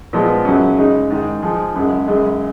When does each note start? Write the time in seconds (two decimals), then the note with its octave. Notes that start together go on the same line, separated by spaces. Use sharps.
0.13 A#2 F3 G#3 B3
0.45 F#2 C#3 F#3 C#4
0.78 C#3 G#3 D#4
1.10 G#2 D#3 G#3
1.42 F3 G#3 D#4 G#4
1.75 F#2 C#3 G#3
2.08 F#2 C#3 G#3